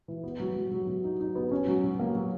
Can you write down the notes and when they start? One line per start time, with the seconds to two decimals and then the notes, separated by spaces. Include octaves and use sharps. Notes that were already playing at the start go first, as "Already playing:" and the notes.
0.08 E3
0.24 B3
0.40 F#3
0.56 F#3
0.72 F#3
0.87 F#3
1.04 D#4
1.20 D#4
1.35 B3
1.51 C#4
1.67 F#3
1.84 F#3
2.00 A#3
2.15 F#3